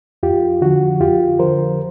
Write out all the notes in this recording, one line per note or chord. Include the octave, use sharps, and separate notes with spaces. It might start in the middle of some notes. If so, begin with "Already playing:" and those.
F2 F4 G4
D3 F3 F#4
F2 F4 G4
D3 F3 A#4 C5